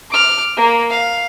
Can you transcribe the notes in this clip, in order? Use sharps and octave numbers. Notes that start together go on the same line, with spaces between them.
D6 F6
A#3
F5